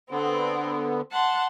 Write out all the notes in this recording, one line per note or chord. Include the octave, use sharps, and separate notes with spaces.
D3 B3 C4
F#5 A5 C6